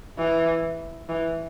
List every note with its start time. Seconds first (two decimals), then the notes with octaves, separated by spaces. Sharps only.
0.19 E3
1.09 E3